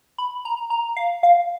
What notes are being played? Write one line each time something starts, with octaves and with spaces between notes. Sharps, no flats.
B5
A#5
A#5
F5
F5